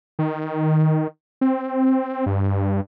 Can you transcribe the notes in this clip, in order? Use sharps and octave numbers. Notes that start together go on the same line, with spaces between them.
D#3
C4
G2